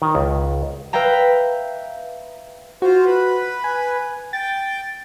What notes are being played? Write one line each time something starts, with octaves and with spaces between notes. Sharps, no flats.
D#3
C#2
B4 E5 F5 G5 A#5
F4 F#4 C5
B4
G#5
G5 A6